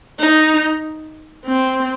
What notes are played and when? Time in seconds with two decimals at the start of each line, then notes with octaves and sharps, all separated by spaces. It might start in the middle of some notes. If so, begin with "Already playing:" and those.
0.20 D#4
1.46 C4